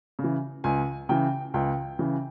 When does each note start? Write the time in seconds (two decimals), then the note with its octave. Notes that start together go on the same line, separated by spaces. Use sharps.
0.19 C#3
0.24 E3
0.64 C#2 G#5
1.09 C#3 E3 G5
1.54 C#2 G5
1.99 C#3 E3